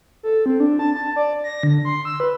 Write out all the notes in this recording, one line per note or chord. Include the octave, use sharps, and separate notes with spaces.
A4
C4
D4
A5
A5
D5
A#6
D3
C6
E6
B4